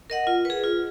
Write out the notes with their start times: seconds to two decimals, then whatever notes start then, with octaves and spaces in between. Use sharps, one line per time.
0.10 A#4 D#5 F#5
0.27 F4
0.45 G#4 B4
0.64 F4